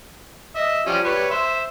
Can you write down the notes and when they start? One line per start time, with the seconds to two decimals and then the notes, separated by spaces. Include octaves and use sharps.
0.55 D#5 E5
0.87 F3 G3 C#4
1.05 G3 B4 C#5
1.31 C5 E5